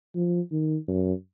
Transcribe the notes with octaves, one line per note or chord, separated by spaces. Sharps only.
F3
D#3
F#2